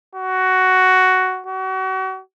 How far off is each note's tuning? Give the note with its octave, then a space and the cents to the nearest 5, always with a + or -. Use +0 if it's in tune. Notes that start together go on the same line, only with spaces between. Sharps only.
F#4 +10
F#4 +35